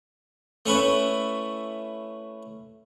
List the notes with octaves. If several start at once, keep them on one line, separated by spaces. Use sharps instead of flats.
A3 C#4 E4 B4